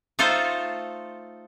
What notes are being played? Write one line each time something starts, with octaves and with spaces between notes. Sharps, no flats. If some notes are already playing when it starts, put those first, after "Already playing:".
A3 D#4 F4 A4 C5